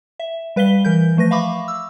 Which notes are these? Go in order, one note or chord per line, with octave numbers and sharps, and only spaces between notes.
E5
G3 B4 F5 B6 G7
E3 A#4 G6
F3 A3 B4 A#6
E5 F5 B5 C#6 D6
E6